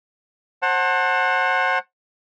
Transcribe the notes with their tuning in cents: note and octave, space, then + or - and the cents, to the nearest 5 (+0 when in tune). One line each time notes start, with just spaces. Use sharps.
C5 +35 F#5 +0 A5 +20